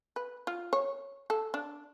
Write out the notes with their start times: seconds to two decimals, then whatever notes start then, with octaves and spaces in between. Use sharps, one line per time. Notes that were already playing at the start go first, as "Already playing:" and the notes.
0.16 B4
0.47 F4
0.73 C#5
1.30 A4
1.54 D4